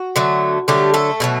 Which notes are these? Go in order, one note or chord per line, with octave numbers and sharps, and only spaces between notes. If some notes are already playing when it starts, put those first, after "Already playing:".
Already playing: F#4
D3 F#3 A3
D3 F#3 G3 A3 G4
A3 A4
B2 F#3 A3